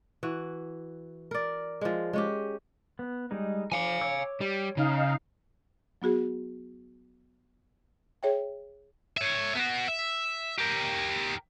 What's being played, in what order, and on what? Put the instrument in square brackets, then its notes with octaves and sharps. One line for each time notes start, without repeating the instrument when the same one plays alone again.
[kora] E3 F#4
A#4 D5
F3 G#3
G#3 C#4 G4
[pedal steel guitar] B3
G3 G#3 D#4
[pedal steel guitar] F3 D6 [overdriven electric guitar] F5 G#5
[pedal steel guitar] C#5 D6 E6
[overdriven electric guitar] G3
[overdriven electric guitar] C#3 [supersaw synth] D#4 F5
[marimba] F#3 B3 F#4 G#4
G#4 C#5 E5 G5
[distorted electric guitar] C#5 E5
B3 F#4
E5
G4 A#4